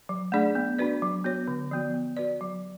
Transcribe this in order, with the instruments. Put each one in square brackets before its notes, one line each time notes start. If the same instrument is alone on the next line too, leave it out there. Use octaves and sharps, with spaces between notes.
[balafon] F#3
A3 D4 G#4 D5
B3
D4 F#4 B4 D5
F#3
B3 F#4 C#5
D3
F3 B3 F#4
B3
F#4 B4 D5
F#3